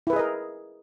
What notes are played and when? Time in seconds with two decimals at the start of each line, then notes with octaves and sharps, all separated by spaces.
0.07 E4
0.10 B4
0.13 G#4
0.16 D#5
0.19 A#4